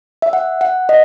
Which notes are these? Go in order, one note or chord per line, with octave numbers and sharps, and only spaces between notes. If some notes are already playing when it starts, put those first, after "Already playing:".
E5
F#5
F#5
D#5